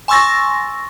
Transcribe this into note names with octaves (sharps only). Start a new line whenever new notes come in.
G#5 C6 C#6 E6 A6 A#6